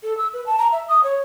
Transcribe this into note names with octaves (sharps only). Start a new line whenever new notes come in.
A4
E6
B4
A5
A#5
E5
D#6
C#5